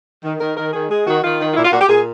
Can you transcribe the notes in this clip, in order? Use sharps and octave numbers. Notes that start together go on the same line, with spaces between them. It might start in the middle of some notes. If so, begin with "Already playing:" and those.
D#3
D#3 A#4
D#3 A#4
D#3 G#4
G#3 G#4
D#3 F#4
D#3 F4
D#3
F4
A#2 E4
F4
A#2 F#4
G4
A#2 G#4